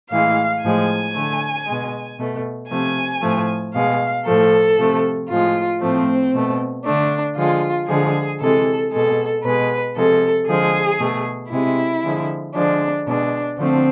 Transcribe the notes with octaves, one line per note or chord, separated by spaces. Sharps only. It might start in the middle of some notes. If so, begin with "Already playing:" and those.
A2 E3 G#3 F5
A2 F3 G#3 G#5
D3 A3
B2 G#3
B2 A3
C3 F3 A3 G#5
A2 F3 A3
B2 G#3 F5
A2 F3 A3 A4
C3 F3 A3
A2 F3 G#3 F4
A2 F3 A3 C4
B2 A3
D3 A3 D4
D3 F3 G#3 F4
D3 F3 G#3 G#4
C3 E3 G#3 A4
B2 G#3 A4
B2 G#3 B4
C3 F3 G#3 A4
D3 F3 G#3 G#4
B2 A3
C3 G#3 E4
D3 F3 G#3
D3 F3 G#3 D4
B2 G#3 D4
D3 F3 A3 C4